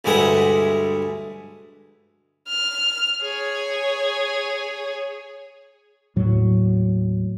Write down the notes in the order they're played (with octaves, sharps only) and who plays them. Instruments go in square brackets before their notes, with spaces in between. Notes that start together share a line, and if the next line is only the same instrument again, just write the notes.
[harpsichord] D2 G2 G#3 E5 F#5
[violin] F6
G#4 C#5
[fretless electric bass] D#2 A2 F#3